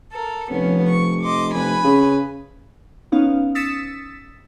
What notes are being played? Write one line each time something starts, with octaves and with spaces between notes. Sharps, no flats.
A4 A#4
F1 F3 B3 C#4
C#6
D#5 C6 D6
F1 B4 G#5 B5
C#3
B3 C#4 D#4 F5
D#6 E6 A6 B6 C#7 E7